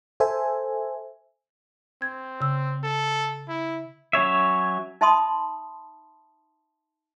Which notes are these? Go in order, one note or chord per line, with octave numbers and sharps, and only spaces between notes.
A4 C5 E5 G#5
C4 G#6
C#3 E6
A4
E4
F#3 C#4 C#5 E5
D#4 E5 A5 B5 C6 D#6